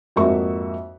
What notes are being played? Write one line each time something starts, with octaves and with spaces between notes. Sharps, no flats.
F2 G#2 A#3 F#4 E5 C#6